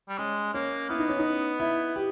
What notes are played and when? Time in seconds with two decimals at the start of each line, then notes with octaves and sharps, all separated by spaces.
0.09 G3
0.18 G#3 C#4
0.54 A#3 C#4
0.89 B3 E4
0.99 D#4
1.09 C#4
1.19 D#4
1.60 E4
1.96 G4